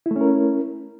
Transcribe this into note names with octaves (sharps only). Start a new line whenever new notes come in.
A3 C#4 E4 A#4